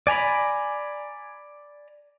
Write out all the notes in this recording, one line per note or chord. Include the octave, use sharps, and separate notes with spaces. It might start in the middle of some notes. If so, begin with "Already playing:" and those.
D5 G#5 A#5 B5